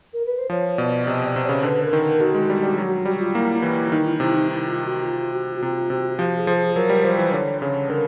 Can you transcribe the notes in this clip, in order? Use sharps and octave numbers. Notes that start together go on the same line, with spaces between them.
A#4
B4
C5
F3 C#5
B2 D5
C3 D#5
C3 D5
C3
C#3 C#5
D3 B4
A#4
D#3
A#4
D#3 F#4
G#3
G3
G3
F#3
G3 F#4
F4
A#3 E4
E3 E4
D#3 D#4
E4
C3 E4
D#4
E4
F4
F#4
F4
F#4
F#4
C3 F4
C3 F#4
F3 G4
G#4
F3
G#4
F#3 A#4
G3
F3 C5
E3
D3 C#5
C#3 C#5
D3 A#4